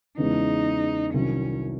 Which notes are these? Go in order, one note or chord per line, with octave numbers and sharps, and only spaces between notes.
E2 C#3 E3 G#3 D#4
C2 C3 D#3 F#3 C#4